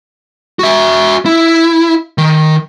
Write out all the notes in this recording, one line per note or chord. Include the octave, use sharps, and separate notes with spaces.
F#4 E5
E4
D#3